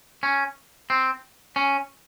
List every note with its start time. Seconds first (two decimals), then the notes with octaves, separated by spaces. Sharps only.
0.23 C#4
0.90 C4
1.56 C#4